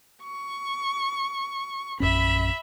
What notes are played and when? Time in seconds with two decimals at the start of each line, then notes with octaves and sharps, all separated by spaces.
0.23 C#6
2.00 A#1 F#2 C#4 E5 B5